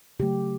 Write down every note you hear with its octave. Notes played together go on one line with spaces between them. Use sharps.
C#3 F#3 A3 G4